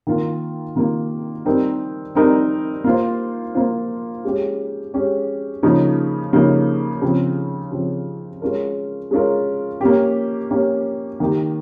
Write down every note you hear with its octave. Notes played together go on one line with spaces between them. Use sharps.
D#3 A#3 F4 A#4
D#3 A#3 F4 A#4
G3 C4 D#4 A#4
G3 C4 D#4 A#4
A#3 F4 C5
A#3 F4 C5
G#3 C#4 G4
G#3 C#4 G4
C#3 F3 A#3 D#4
C#3 F3 A#3 D#4
C#3 F3 C4
C#3 F3 C4
G#3 C#4 F4 A#4
G#3 C#4 F4 A#4
A#3 C#4 G4
A#3 C#4 G4
D#3 A#3 D#4 G4